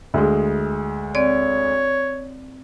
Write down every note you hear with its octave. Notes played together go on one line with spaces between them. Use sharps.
D2 G#3
C4 C#5 D5